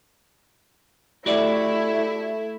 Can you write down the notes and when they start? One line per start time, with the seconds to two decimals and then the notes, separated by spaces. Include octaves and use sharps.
1.26 A3 E4 F#4 G4 D5